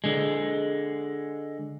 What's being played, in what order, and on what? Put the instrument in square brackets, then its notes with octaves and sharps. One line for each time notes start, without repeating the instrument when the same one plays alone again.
[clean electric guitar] D3 G#3